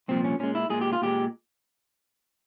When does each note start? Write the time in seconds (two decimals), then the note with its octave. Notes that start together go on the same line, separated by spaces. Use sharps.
0.08 C2 A#2 F3 C4
0.24 C#4
0.39 A#2 G#3 C#4
0.55 E4
0.70 A#2 G#3 G#4
0.81 G4
0.93 F4
1.02 A#2 G#3 G4